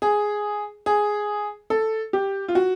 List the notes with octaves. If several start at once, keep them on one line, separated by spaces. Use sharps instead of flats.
G#4
G#4
A4
G4
F4
F#4